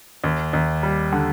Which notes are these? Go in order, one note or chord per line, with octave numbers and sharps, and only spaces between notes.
D#2
D#2
G3
D3